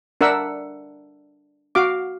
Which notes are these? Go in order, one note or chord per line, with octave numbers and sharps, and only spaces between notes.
D4 A#4 E5 F#5 E6
F#4 F5 D6